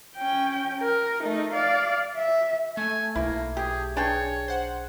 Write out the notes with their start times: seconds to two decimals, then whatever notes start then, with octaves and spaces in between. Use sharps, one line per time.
0.16 C#4 G5
0.80 A#4
1.22 A3 D#4
1.53 D5 F5
2.17 E5
2.77 A3 G#5
3.15 B1 A#3 E4
3.57 G4 G#4
3.97 D4 G#4 C#5 G5
4.48 C5 F#5